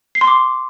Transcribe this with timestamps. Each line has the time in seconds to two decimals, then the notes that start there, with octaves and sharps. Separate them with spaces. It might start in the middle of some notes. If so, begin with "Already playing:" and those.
0.15 C7
0.21 C6
0.27 D6